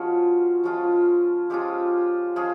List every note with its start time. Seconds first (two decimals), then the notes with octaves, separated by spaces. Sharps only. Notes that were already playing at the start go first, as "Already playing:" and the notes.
Already playing: F3 G#3 C#4 F4 F#4
0.64 F3 G#3 C#4 F4
1.50 F3 G#3 C#4 F4 G4
2.36 F3 G#3 C#4 F4 G#4